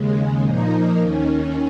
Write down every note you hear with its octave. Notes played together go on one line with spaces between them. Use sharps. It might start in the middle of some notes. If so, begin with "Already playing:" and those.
Already playing: D#2 C#3 G#3
A#2 F3 A#3 D#4
D#2 D#3 C#4